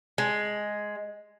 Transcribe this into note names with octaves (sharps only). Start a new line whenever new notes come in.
G#3